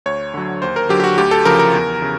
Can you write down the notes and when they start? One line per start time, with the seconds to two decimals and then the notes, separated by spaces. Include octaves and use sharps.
0.06 D2 C#5
0.34 D3 F#3
0.62 D#2 C5
0.76 A#4
0.89 D3 F#3 G4
1.00 G4
1.04 F#4
1.18 D2 G4
1.31 A4
1.45 C#3 F3 A#4
1.59 A#4
1.74 E2
2.02 C#3